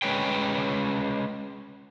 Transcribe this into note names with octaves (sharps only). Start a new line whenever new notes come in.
G#3 C#4 B4 C#5 G5